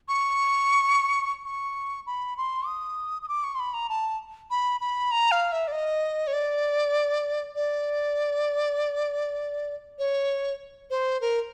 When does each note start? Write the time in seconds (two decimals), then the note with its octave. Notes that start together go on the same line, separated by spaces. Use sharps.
0.08 C#6
1.46 C#6
2.06 B5
2.37 C6
2.67 D#6
3.22 D#6
3.29 D6
3.44 C#6
3.55 C6
3.59 B5
3.74 A#5
3.89 A5
4.50 B5
4.81 B5
5.11 A#5
5.31 F5
5.52 E5
5.68 D5
5.72 D#5
6.27 C#5
6.33 D5
7.55 D5
9.99 C#5
10.90 C5
11.21 A#4